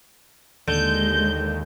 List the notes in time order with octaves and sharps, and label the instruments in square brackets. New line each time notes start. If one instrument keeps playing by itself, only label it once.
[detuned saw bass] D#2 [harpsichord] D3 [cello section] G#3 [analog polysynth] G6